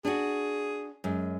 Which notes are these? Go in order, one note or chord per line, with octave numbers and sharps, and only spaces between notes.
D4 F#4 G#4
F#2 G#3